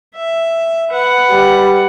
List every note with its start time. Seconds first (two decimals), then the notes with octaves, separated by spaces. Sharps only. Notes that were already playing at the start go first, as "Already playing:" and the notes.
0.16 E5
0.91 B4 F#5
1.30 G3